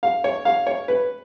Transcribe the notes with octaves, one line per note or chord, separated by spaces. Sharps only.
F5
C#5
F5
C#5
B4